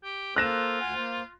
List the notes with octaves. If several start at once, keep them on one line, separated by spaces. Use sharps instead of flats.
G4
A#3 F4 A4 C5 F#6 A#6 E7
D2 F#5 G#5
A#3 C5